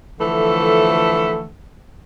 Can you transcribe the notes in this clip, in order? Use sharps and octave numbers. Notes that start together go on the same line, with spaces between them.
D3 E3 F3 A3 A4